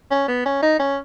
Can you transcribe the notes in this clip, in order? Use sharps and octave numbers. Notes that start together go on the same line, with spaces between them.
C#4
B3
C#4
D#4
C#4